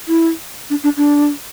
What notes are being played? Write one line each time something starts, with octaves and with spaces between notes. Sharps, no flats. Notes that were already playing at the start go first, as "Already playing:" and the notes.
E4
D4
D4
D4